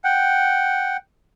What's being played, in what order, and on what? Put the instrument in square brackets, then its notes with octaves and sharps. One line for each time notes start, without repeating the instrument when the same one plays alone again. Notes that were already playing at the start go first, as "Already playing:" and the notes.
[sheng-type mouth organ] F#5 G5